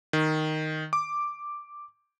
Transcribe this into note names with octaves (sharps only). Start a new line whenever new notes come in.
D#3
D6